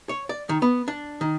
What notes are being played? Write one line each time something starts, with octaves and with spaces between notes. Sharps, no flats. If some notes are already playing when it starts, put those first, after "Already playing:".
C#5
D5
D#3
B3
D4
D#3